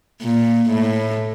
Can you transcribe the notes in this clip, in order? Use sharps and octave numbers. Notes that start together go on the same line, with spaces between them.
A#2
A2